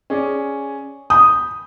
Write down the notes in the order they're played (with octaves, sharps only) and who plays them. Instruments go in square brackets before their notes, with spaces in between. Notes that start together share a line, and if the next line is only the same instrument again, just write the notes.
[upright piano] C#4 G#4 D5
[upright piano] B5 G6 [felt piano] D#6